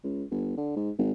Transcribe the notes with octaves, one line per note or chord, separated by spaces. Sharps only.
C#2
G1
D3
G#2
G#1